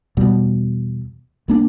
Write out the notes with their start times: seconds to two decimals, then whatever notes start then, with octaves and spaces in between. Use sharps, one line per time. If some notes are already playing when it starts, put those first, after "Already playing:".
0.17 E2 B2 G3
1.48 C2 A#3 D4